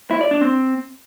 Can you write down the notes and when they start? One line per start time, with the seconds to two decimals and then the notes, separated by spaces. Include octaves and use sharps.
0.11 E4
0.21 D5
0.31 D4
0.41 C4